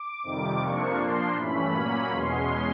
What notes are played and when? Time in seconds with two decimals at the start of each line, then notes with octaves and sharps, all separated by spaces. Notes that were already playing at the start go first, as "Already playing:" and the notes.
Already playing: D6
0.23 F2 C3 D#3 G3
0.60 F2 C3 F3 A#3 D4 C#6
0.98 A#2 F3 A#3 D4 C6
1.36 G2 E3 A3 C#4 B5
1.73 A#2 F#3 A#3 C#4
2.10 E2 B2 G#3 C#4 C6